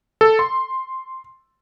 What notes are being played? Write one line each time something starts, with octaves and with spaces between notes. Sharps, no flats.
A4
C6